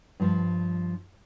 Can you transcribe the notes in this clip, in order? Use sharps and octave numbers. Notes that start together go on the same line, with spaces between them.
G2 F3